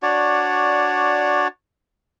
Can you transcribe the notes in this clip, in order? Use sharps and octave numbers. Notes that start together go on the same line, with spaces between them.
D4 F#4 C#5 D5